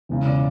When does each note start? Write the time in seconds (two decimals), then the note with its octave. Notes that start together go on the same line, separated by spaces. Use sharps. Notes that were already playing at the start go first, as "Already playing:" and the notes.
0.09 E1 E2 C#3
0.27 D5